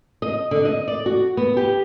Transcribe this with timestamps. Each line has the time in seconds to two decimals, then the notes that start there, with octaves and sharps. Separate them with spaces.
0.22 D#5
0.51 D3
0.65 D#5
0.88 D5
1.06 F#4
1.37 B3
1.57 G4